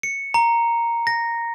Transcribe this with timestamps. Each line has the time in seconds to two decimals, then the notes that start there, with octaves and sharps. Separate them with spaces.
0.03 C#7
0.34 A#5
1.07 A#6